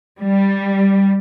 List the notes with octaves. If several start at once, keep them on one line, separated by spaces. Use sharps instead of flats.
G3